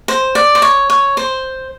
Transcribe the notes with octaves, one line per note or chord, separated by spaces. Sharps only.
C5
D5
C5
C#5
C#5
C5